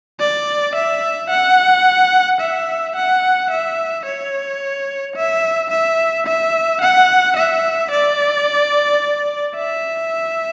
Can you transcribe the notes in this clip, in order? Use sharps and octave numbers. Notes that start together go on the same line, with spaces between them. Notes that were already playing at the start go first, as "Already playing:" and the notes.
D5
E5
F#5
E5
F#5
E5
C#5
E5
E5
E5
F#5
E5
D5
E5